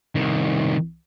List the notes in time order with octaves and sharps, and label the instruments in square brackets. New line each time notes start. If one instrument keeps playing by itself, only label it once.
[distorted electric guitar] C2 D#3